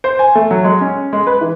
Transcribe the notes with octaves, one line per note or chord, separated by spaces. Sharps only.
C5
G#5
A3
F#3
G#3
C#4
G#3
B4
E3